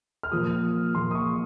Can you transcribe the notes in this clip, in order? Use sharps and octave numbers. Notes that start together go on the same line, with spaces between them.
F6
A#2 F3 A#3 F4 D#6
A#2 F3 A#3 F4 C6
D#6
C#6